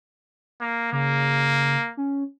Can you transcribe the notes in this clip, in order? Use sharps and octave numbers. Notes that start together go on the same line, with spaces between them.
A#3
C#3 A#3
C#4